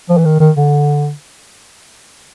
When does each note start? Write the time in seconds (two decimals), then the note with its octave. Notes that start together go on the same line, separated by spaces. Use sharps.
0.09 F3
0.18 E3
0.25 D#3
0.40 D#3
0.57 D3